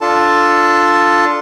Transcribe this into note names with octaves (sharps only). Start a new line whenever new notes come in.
D4 F4 A4 A5